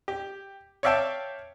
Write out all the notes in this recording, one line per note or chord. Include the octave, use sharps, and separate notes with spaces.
G4
C#5 D5 E5 F5 G5 A5